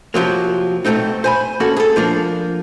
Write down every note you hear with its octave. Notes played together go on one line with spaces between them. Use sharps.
C3 F3 F#3 A#3
B1 G2 A3 C4 D#4
C5 G#5 B5
A#3 C#4 F#4 A4
G#4 A4
F3 A#3 D4